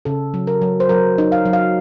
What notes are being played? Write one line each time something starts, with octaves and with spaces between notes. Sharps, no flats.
C#3 A4
F#3
A#4
F#3
C5
F#3 A#4
D#4
F5
F#3
F5